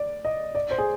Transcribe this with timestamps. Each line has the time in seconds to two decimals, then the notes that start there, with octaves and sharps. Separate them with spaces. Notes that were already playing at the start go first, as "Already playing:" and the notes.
Already playing: D5
0.25 D#5
0.55 D5
0.71 C5
0.78 G#4